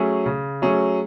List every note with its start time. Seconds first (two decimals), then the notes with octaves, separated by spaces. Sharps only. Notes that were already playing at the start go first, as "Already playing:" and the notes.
Already playing: F#3 A3 C#4 G#4
0.26 C#3
0.62 F#3 A3 C#4 G#4